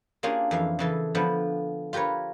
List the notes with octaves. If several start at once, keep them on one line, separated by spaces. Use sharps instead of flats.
A#3 C#4 D4 F4 G4 G#4
F2 E3 F5
C#3 E3 A4
D3 F3 B3
F4 G4 A#4 B4 C#5